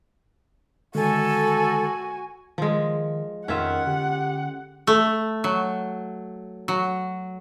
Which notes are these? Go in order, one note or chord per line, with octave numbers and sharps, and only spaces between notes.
D3 D#3 G#3 F#4 A4 G#5
D#3 F3 G#3
F2 D#3 C#4 F4 E5 F#5
D3 G4
A3
F#3
F#3